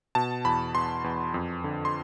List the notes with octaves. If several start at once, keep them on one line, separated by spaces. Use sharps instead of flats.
B2 A5
E2 B5
E2 C6
E2
F2
D3
C6